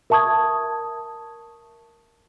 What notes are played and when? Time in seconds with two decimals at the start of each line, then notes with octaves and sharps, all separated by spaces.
0.10 A#4 E5 A5 C#6 D#6 G#6